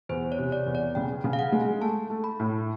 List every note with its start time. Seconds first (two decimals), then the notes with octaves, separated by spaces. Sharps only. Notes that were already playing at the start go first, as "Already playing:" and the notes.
0.09 E2 C5
0.32 C#5
0.38 C3
0.52 D5
0.66 E2
0.75 D5
0.95 C#3 G5
1.24 C#3
1.33 F5
1.39 F#5
1.52 G#3
1.81 A3 A5
2.10 A3
2.24 B5
2.39 A2